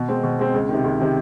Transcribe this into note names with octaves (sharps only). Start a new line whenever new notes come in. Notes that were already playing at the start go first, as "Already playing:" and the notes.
Already playing: B2
G#3 C4
B2
G#3 C4
C#2
C3 D#3
C#2
C3 D#3